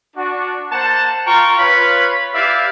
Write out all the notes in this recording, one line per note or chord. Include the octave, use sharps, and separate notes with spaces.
D4 F#4
A#3 C5 F#5 A5
F4 A#4 F5 G5 A#5 C#6
F4 B4 C#5 F5 B5
E4 G4 B4 D5 E5 F5